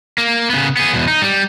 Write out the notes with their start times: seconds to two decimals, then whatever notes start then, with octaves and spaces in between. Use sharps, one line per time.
0.18 A#3
0.50 C#3 B3
0.77 B3 G#4
0.94 E2 B2
1.08 D#4
1.22 G3